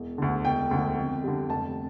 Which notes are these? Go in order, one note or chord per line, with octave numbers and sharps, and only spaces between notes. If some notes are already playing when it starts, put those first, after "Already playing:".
Already playing: E1
D2 D3
E1 G5
D2 D3
F2
D3 G3
F1 A5